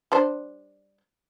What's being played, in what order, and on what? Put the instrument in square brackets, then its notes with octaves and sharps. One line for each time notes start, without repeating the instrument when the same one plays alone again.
[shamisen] G3 D4 C5